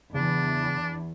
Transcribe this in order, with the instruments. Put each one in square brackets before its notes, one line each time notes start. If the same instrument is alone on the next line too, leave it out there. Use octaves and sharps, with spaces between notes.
[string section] E2 [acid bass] C#3 [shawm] D4